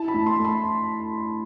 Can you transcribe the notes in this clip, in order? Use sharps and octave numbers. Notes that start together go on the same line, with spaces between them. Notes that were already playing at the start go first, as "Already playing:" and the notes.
Already playing: E4 A5
B5
A2
C6
A3
B5